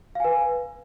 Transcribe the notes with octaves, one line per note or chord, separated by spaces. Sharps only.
B4 F5 G#5